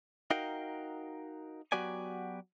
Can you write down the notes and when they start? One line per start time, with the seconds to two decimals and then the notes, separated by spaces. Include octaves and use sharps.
0.31 D#4 F#4 A#4 F5 G5
1.72 F#3 B3 F#4 G4 D5 G#5